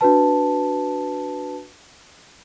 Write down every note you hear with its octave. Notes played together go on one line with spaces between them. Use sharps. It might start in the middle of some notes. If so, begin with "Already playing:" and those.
D4 F#4 B4 A5